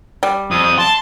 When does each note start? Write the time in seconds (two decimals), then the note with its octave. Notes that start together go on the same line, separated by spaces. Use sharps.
0.23 G3
0.51 F2 D#6
0.78 A5 C6